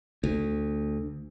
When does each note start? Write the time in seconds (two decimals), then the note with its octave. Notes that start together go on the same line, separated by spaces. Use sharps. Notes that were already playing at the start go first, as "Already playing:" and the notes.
0.24 D2